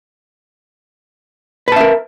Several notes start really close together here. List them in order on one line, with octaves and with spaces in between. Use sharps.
B4 A5 E5 A#4